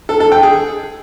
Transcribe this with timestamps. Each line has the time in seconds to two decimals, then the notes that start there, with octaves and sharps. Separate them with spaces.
0.09 A4
0.20 A4
0.32 G5
0.43 G#4